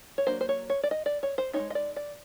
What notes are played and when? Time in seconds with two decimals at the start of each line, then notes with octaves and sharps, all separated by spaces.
0.18 C#5
0.27 F#3 A#3 D4 C5
0.41 C5
0.49 C#5
0.70 C#5
0.83 D5
0.91 D#5
1.06 D5
1.23 C#5
1.38 C5
1.53 C4 D#4 C#5
1.59 G#3
1.70 D#5
1.75 D5
1.96 D5